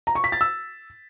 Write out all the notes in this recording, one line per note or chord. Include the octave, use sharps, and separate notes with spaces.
A#5
C#6
B6
A6
E6